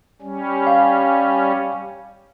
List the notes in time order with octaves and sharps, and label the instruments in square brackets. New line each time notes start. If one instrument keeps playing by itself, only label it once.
[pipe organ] G3 C#4
[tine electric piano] F5